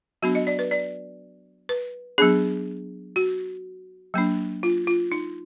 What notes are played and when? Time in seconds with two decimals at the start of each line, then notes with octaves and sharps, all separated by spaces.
0.22 F#3 B3 D4 F#4
0.35 D#5
0.47 D5
0.59 B4
0.71 D5
1.69 B4
2.18 F#3 B3 D4 G#4
3.16 F#4
4.14 F#3 A#3 D4
4.63 F4
4.87 F4
5.12 D#4